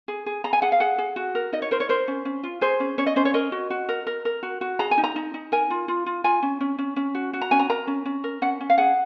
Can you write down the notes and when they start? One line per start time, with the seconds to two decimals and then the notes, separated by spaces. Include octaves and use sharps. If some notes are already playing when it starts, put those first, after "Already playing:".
0.08 G#4
0.26 G#4
0.44 G#4 A#5
0.53 G#5
0.62 G#4 F#5
0.72 F5
0.80 G#4 F#5
0.98 G#4
1.16 F#4
1.35 A#4
1.53 D#4 D#5
1.62 C#5
1.71 A#4 C5
1.80 C#5
1.89 A#4 C5
2.08 C#4
2.25 C#4
2.43 F4
2.61 G#4 C5
2.80 C#4
2.98 C#4 C#5
3.06 D#5
3.16 C#4 C5
3.25 C#5
3.34 A#4 D#5
3.52 F#4
3.70 F#4
3.89 A#4
4.07 A#4
4.25 A#4
4.43 F#4
4.61 F#4
4.79 G#4 A#5
4.91 G#5
4.98 D#4
5.04 A#5
5.16 D#4
5.34 D#4
5.52 A#4 G#5
5.70 F4
5.88 F4
6.06 F4
6.24 F4 G#5
6.43 C#4
6.61 C#4
6.78 C#4
6.96 C#4
7.15 F#4
7.33 F#4
7.41 A#5
7.51 C#4 G#5
7.59 A#5
7.69 A#4 A#5
7.87 C#4
8.05 C#4
8.24 A#4
8.42 C#4 F#5
8.61 C#4
8.70 F5
8.78 G#4 F#5